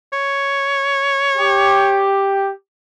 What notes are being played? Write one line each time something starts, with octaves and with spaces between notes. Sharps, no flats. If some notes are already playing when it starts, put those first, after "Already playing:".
C#5
G4